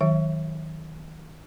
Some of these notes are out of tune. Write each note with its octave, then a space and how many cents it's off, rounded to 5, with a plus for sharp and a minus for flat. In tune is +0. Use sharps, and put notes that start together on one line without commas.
D#3 +25 F#3 +0 E5 -5